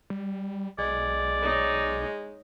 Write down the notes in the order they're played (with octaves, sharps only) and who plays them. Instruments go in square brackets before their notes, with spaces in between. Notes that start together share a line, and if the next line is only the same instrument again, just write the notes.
[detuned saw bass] G3
[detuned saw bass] B1 [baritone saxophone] G#3 [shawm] D5
[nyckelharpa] D#4 C#5